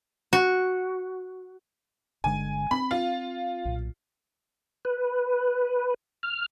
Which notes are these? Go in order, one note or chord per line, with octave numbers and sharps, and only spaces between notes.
F#4
G1 D3 G#3 G#5
C4 B5
F4
B1 A#2
B4
F6